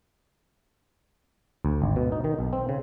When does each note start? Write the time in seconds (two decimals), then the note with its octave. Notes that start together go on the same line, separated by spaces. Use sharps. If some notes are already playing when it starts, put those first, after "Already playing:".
1.65 D2
1.82 G#1
1.96 B2
2.12 D#4
2.24 D#3
2.39 B1
2.53 C4
2.69 C#3